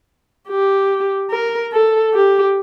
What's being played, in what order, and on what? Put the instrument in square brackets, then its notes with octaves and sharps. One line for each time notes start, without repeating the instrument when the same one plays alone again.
[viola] G4
A#4
A4
G4